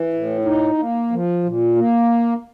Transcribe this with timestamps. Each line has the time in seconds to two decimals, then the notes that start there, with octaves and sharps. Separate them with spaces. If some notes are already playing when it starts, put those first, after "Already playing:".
Already playing: E3
0.14 A2
0.45 D#4
0.78 A#3
1.11 F3
1.44 A#2
1.76 A#3